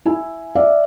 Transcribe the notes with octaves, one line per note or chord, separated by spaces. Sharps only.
E4 G#5
D5 E5 F5